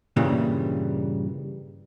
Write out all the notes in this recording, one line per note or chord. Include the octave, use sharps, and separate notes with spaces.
G2 A#2 C#3 E3 G3